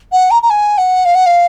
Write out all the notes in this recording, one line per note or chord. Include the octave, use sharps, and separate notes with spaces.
F#5
A#5
A#5
G#5
F#5
F5
F#5
F5